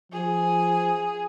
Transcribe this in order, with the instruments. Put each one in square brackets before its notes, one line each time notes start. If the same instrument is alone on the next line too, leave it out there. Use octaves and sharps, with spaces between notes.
[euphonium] F3 [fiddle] G#4